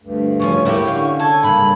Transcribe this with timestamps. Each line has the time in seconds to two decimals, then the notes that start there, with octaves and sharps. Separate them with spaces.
0.02 D2 G2
0.40 C#3 F3 C#4 C#6
0.65 A3 A#3 E4 F#4 G4
0.85 D3 C#4 F5
1.19 A4 G#6
1.43 G2 C#3 A#3 B5